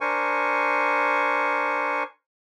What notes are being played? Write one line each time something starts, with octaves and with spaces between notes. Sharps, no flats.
D4 A#4 C5 G#5 C#6